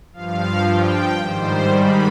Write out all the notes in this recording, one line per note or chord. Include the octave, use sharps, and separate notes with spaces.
G2 F3 F5
G5
G#2 D#3 G3 C5
B5